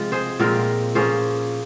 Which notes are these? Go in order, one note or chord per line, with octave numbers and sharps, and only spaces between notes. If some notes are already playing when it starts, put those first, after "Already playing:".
Already playing: C3 F3 G#3
G#4 C5
A#2 F3 G#3 C4 G4 A#4
F3 A#3 C#4 G#4 C5